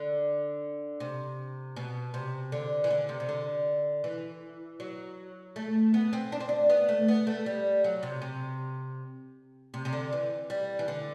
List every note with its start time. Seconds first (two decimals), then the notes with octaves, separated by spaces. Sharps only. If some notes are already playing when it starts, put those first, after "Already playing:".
Already playing: D3
1.00 C3
1.76 B2
2.14 C3
2.52 D3
2.84 E3
2.91 D3
3.09 C3
3.20 C3
3.29 D3
4.04 E3
4.80 F#3
5.56 A3
5.94 B3
6.13 C4
6.32 D4
6.40 C4
6.49 D4
6.70 B3
6.89 A3
7.08 B3
7.27 A3
7.46 G3
7.84 F#3
8.03 C3
8.22 C3
9.74 C3
9.85 C3
9.93 D3
10.13 E3
10.50 G3
10.79 E3
10.88 D3